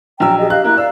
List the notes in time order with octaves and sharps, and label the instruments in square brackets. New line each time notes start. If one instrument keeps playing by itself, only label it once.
[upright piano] A#1 F#3 E6 [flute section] G5 A#5
[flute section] G4 G#4 D#5
[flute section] G4 D#5 F5 [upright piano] F#6
[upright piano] A#3 E4 [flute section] A#5 F#6
[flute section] D5 F5 [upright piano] E6